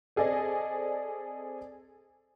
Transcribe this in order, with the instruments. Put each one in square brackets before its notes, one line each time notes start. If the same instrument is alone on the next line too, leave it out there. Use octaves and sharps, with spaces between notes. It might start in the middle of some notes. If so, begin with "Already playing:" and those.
[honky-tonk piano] C4 G#4 A4 D5 D#5